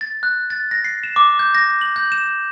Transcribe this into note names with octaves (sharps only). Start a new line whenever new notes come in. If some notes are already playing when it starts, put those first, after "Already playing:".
A6
F#6
A6
A#6
C7
E7
D6
G6
A#6
F#7
G6
E7